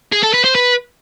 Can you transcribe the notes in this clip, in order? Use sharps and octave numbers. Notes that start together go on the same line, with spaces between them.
G#4
A4
B4
C5
B4